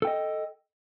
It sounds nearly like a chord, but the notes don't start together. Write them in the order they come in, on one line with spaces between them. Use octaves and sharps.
A4 G5 D#5